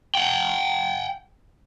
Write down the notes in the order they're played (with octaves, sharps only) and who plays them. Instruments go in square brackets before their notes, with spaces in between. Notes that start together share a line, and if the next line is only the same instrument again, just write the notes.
[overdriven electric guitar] F#5 G5